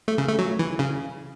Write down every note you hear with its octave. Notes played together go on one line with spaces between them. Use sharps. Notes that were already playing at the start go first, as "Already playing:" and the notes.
A3
C#3
A3
F#3
E3
C#3